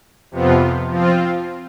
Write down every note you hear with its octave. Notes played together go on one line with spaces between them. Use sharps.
F2 C3 F3 B3 F4
F3 C4 F4